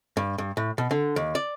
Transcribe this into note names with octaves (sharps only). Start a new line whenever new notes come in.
G2
G2
A2
B2
D3
D#2
D5